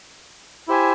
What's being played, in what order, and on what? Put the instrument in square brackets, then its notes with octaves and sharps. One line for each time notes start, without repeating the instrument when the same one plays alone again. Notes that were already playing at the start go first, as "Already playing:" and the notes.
[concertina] E4 G4 C5 E5 G#5